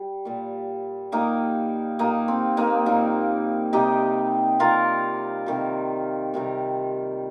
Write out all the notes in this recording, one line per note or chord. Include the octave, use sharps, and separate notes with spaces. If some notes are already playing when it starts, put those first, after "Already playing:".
Already playing: G3
A#2 G3
A#2 G3 A#3 D#4
A#2 G3 A#3 D#4
C4
A#3 D#4
A#2 G3 A#3 D#4
C3 G3 D#4 G4
C3 G3 F4 A#4
C3 D#3 G3
C3 D#3 G3